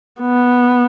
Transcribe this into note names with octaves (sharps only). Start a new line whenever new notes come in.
B3